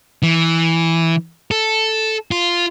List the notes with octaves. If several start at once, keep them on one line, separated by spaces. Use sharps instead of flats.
E3
A4
F4